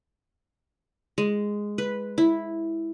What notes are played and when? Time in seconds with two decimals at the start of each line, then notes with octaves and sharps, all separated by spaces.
1.18 G#3
1.78 B4
2.18 E4